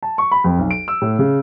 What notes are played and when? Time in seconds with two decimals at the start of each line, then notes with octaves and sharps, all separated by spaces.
0.03 A5
0.18 C#6
0.32 B5
0.44 F2
0.59 B1
0.71 D7
0.88 E6
1.02 A2
1.19 C#3